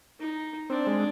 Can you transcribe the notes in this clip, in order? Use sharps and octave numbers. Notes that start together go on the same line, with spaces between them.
D#4
C4 D4
G#3